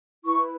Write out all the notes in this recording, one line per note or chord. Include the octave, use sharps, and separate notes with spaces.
E4 B4 C#6